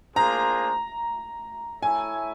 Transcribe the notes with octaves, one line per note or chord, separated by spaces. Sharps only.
A#3 D4 F4 G#4 C5 A#5
E4 A4 C#5 E5 G#5